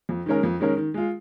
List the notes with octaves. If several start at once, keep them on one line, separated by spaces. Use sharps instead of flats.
F2
D#3 G#3 C#4 A#4
F2
D#3 G#3 C#4 A#4
D#3
G#3 F4